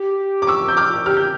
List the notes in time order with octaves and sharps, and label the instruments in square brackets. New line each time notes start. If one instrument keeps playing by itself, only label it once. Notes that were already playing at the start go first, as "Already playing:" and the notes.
Already playing: [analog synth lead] G4
[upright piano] D6
C#6 E6
G6
D6 F6
[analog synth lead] G4 [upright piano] F6
[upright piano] G6